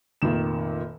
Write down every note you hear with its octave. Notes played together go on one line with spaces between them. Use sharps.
F1 A#2 D#3 E7